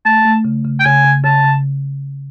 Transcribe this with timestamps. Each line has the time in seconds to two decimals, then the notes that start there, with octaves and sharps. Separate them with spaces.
0.05 A3 A5
0.25 A3
0.45 C#3
0.65 C#3
0.79 G5
0.85 C#3 G#5
1.04 C#3
1.24 C#3 A5
1.44 C#3